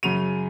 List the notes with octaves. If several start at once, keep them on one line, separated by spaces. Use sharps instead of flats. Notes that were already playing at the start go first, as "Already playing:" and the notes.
F#2 C#3 F#3 D#7 F7